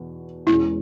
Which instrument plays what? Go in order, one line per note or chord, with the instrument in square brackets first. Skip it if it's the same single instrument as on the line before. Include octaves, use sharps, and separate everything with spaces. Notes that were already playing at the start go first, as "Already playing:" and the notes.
Already playing: [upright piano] E2 B2 B3
[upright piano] E1 E2 B2 G#3 C#4 [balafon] E4